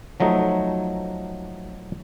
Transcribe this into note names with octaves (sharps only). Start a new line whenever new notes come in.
F3 F#3 A3 D#4